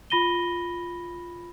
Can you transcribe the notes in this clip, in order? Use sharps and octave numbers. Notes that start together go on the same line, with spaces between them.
F4 B5 A#6 D#7 G7